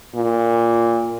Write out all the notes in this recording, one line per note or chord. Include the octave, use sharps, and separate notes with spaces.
A#2